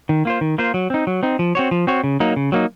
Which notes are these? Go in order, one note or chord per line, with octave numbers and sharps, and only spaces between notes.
D#3
A#3 F4 C5
D#3
A#3 F4 C5
F#3
C4 D#4
F#3
C4 D#4
F3
C4 F#4 C#5
F3
C4 F#4 C#5
C#3
F#3 A#3 D#4
C#3
F#3 A#3 D#4